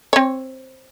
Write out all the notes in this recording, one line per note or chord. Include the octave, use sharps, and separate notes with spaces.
C4 C#5